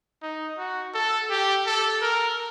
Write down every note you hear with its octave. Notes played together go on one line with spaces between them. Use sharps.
D#4
F#4
A4
G4
A4
A#4